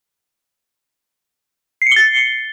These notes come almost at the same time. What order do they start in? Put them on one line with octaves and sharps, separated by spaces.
C7 C#7 G7 A6